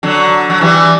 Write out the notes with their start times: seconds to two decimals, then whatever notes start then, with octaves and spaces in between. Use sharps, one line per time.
0.03 D3 F#3
0.50 F#3
0.61 E3 G3